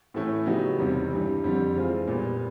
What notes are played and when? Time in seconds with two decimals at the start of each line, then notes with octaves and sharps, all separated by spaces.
0.14 A2 E3 A3 C#4 E4
0.46 C#3 F#3 B3 D#4 G4
0.79 E2 C3 D#3 G3
1.11 G2 E3 G3
1.44 F2 D3 G3
1.75 E3 G#3 C4 F4
2.07 A#2 G3 B3